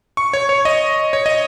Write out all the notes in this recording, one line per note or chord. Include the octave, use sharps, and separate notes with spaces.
C#6
C#5
C#5
D#5
C#5
D#5